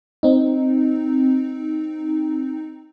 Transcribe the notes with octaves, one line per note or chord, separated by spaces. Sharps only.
C4 D#4